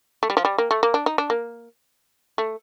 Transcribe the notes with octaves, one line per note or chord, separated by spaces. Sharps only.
A3
G3
F3
G3
A#3
A3
A#3
D4
D#4
D4
A#3
A3